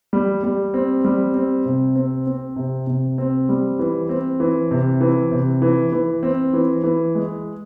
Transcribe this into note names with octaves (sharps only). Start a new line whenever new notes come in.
G3
G3
C4
G3
C4
C3
C4
C4
C3
C3
C4
G3
E3
C4
E3
C3
E3
C3
E3
E3
C4
E3
E3
G#3